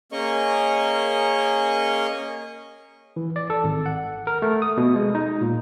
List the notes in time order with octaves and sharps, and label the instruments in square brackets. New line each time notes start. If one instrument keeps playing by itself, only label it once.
[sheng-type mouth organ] A#3 C#4 G#4 A#4 D#5 C#6
[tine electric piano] E3
D5
A4
G#1
F#5
A#4
A3
D#6
B2
G#3
D#4
A#2